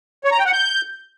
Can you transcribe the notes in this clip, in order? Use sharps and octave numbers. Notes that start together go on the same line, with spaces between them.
C#5
A#5
G5
F#5
G6